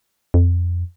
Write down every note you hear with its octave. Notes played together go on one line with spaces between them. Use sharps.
F2